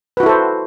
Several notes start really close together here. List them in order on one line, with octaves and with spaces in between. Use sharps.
B4 F#4 E4 A4 C5